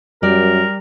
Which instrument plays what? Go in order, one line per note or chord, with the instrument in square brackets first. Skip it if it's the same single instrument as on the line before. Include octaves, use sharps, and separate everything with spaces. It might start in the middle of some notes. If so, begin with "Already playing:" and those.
[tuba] F#2 [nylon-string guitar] G3 D5 [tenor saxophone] A#4